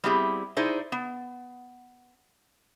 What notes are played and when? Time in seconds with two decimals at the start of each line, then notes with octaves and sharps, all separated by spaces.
0.04 G3 B3 C4 E4 G4 G#4
0.57 D#4 E4 G#4 C5 D5
0.92 B3